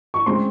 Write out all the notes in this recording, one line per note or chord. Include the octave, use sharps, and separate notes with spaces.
C#6
C#3 G#3 C4 C6